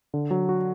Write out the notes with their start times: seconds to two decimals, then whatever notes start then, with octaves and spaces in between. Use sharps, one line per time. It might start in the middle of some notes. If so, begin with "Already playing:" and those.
0.14 D3
0.31 F#3
0.49 F#4